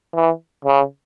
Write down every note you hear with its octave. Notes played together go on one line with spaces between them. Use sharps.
E3
C#3